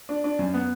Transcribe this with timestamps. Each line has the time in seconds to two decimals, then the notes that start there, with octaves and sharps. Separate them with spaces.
0.09 D4
0.24 D4
0.39 F#2
0.54 B3